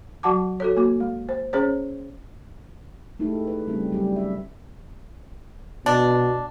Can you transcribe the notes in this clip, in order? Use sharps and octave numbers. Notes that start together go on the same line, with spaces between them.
F#3 F#4 F#5 A5 D6
F#4 A4 C#5
A#3 F#4
G#3
C5
C#4 G#4 C5 C#5
G#3 A3 D#4 E4 G4 A4
B4
C#3 G3 A3 C4 C#4
F#3 G3 C4 G4
E5
B2 D4